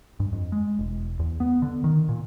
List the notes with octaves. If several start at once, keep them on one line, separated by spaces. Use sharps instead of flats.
G2
F2
G#3
E1
E2
B3
D3
D#3
A#2